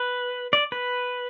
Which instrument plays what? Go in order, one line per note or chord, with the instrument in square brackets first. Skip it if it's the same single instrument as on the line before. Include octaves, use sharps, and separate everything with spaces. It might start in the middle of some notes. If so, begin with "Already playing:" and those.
Already playing: [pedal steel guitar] B4
D5
B4